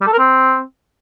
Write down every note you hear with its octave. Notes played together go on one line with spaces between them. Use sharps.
G3
A4
A#4
C4